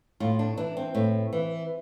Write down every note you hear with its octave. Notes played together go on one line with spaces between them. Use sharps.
A2 F4
D4
E3 D4
C4
A2
E3